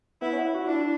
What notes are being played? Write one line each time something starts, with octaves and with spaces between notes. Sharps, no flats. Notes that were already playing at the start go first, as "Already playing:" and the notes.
B3 E4
C#4
F#4
E4
F#4
D4 E4